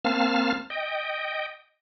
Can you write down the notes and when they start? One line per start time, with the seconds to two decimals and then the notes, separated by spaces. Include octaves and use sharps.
0.05 A#3 C4 F5 A5 F6
0.70 D#5 G5